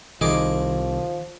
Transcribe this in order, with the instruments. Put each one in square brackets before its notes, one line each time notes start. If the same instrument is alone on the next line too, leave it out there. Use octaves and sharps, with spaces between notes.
[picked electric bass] C2 [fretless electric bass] D#3 [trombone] F3 [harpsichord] G#4 D#5 D6